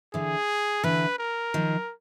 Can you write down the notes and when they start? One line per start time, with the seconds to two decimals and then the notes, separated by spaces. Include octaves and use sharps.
0.14 D3 E3 G#4
0.84 D3 E3 B4
1.19 A#4
1.54 D#3 F3